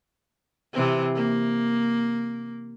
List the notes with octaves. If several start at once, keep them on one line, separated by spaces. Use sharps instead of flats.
C3 E3 C4
A#3